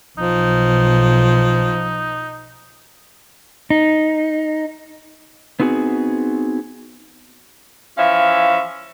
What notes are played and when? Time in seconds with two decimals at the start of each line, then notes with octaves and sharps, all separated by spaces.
0.18 B1 F3 D#4
3.70 D#4
5.60 B3 C4 D#4 F#4 G#4
7.98 E3 F3 C#4 E5 F5